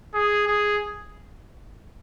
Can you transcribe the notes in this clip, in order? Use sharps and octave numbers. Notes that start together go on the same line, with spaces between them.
G#4
G#4